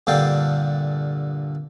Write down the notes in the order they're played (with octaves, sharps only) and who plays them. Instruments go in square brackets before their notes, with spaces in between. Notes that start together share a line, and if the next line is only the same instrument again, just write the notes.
[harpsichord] G2 A#2 D3 A4 F5 G5